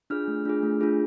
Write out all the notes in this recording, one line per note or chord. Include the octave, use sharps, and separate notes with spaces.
D4 F4 G#4 F6
A3
D4 F4 G#4
A3
D4 F4 G#4